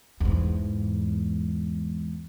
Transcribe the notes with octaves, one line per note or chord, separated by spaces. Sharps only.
E2 G#2